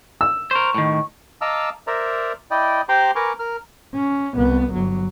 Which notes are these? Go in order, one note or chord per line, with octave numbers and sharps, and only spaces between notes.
E6
A#4 C5 C#6
A2 D#3
D#5 F5 A5 A#5 D6 E6
A#4 C5 D5 E5 A#5
E4 D5 D#5 G5
G4 C5 G5 A#5 C6 D6
A#4 B4 G#5 A#5 C#6 D6
A#4 F6
C#4
C2 B3
G1 F#3